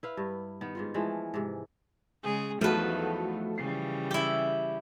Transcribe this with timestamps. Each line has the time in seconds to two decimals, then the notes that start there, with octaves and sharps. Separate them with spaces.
0.03 E4 B4 F5
0.17 G2
0.61 D#3 B3
0.75 G#2 D#3 F4
0.94 E3 F3 G#3 A3
1.34 G#2 C3
2.23 C#3 G#3 G#4
2.61 E2 F3 F#3 A3 D#4 F#4 A4 B4
3.58 C#3 E3 G3 C7
4.11 E4 G4